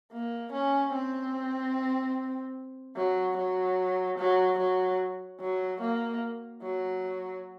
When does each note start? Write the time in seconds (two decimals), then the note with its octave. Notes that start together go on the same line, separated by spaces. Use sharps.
0.12 A#3
0.53 C#4
0.93 C4
2.96 F#3
3.37 F#3
4.18 F#3
4.59 F#3
5.40 F#3
5.81 A#3
6.63 F#3